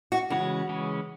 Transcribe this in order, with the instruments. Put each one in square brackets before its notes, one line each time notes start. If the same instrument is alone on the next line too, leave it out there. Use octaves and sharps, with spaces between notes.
[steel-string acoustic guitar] F#4
[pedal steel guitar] C#3 E3 G#3 C#4 [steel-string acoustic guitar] F#4
[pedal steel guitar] C#3 E3 G#3 C#4